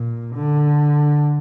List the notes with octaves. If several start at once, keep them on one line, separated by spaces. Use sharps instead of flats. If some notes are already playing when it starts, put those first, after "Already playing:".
Already playing: A#2
D3